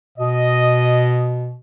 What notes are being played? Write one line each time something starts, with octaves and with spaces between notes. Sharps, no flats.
B2 D#5